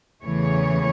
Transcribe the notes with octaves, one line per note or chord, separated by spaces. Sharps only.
E2 C#3 E3 A3 C#5